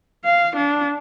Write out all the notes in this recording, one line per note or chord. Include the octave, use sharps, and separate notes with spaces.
F5
D4